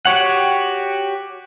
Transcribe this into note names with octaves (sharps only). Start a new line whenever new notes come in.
F#4 G4 C#5 F#5